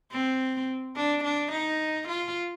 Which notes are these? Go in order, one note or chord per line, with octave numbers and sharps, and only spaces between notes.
C4
D4
D4
D#4
F4